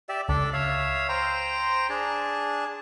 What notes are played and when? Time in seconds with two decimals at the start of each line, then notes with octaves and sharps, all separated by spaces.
0.09 G4 D5 E5
0.29 C#2 D4 A4 D5
0.53 C#5 E5 F5
1.09 C5 G5 A#5
1.89 D4 G#4 A5